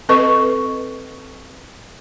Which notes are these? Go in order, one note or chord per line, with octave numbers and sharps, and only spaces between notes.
C4 A4 B4 D#5 C#6